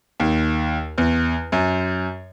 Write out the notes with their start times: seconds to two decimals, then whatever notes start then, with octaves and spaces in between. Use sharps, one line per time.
0.20 D#2
0.98 E2
1.52 F#2